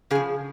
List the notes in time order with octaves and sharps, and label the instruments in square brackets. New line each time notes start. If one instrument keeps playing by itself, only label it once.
[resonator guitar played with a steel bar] C#3 F3 G#4